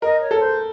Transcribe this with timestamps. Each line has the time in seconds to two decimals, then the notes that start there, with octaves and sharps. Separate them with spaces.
0.02 A#4 D#5
0.20 C#5
0.31 A4
0.40 C5